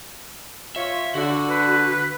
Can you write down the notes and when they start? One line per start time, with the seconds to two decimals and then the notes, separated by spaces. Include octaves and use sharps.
0.76 F4 C#5 E5
1.15 D3 F#4
1.50 B4